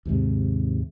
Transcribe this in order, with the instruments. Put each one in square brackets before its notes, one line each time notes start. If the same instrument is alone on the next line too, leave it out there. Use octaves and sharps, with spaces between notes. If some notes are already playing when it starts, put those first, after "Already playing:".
[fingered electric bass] D#2 G#2 C3